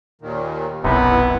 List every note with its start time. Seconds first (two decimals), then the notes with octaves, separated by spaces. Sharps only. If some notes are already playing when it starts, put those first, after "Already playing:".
0.21 D#2 A#2 D#3
0.84 F1 B1 F#2 C3 B3 D#4 E4